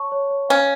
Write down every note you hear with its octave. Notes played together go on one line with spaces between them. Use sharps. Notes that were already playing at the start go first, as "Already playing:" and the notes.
Already playing: C#5 A5 C#6
C#5
C#5
C#4 F5